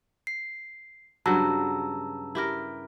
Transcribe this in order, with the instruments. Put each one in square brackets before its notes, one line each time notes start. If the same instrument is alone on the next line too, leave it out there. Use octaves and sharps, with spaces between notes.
[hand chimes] C7
[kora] G2 C#3 F#3 [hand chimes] A5 A#5 E6
[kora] E4 G4 A#4